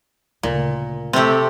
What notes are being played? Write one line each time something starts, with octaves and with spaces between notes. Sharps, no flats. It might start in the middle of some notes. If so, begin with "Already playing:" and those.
D2 A#2 C#3
C3 A3 C4 G4